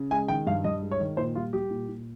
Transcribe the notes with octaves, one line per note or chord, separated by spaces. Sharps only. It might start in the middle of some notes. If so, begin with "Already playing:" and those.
Already playing: C#3
G#3 G#5
D#3 G5
G2 F5
G2 D#5
G#3
C#5
D#3
A#2 C5
G3 F4
G3 G4
A#2
A#2